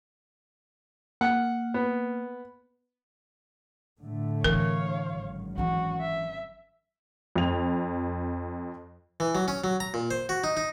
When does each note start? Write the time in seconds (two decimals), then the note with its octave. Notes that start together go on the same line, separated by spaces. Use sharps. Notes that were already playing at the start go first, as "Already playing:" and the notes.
1.21 A#3 F#5
1.74 B3
4.01 A2 D3 A3
4.44 E3 A#4 C#5 F5
5.08 G#1 F#2
5.58 E3 C#4 F#4
6.01 E5
7.36 F2 F7
9.20 E3
9.35 F#3
9.48 C#4
9.64 F#3
9.80 A#5
9.94 A#2
10.11 C5
10.29 F#4
10.44 D#4
10.57 D#4